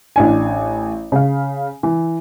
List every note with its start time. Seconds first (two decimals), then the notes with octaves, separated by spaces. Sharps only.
0.16 A1 D4 G#5
1.12 C#3 F5
1.83 E3